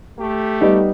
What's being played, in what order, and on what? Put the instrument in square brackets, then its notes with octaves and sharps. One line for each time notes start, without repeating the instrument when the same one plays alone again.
[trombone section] A3 G4
[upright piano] G3 B3 D#4